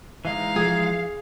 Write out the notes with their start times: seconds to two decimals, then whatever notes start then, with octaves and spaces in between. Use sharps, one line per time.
0.25 E3 G#3 D#4 F5
0.56 F3 G#4